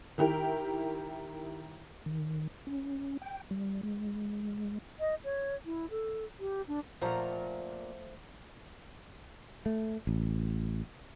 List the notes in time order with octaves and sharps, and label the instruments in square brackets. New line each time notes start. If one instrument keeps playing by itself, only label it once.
[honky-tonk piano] D#3 E4 G4 A#4
[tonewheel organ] D#3
C#4
G5
G3
G#3
[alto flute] D#5
C#5
E4
A4
G4
D4
[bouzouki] A#2 A#4 A#5 [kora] F3 A3 F#5
[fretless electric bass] A3
A1